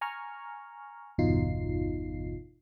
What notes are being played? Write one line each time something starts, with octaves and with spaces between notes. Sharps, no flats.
G#5 A#5 C#6 F6
G1 E2 B2 D#4 F4 C7